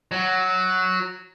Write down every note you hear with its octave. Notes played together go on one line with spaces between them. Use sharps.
F#3